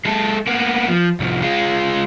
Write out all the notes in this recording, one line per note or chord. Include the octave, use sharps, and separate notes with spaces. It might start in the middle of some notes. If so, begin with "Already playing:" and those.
G#3 A4
A#3 B3
F3
C2 F3
G#3 F4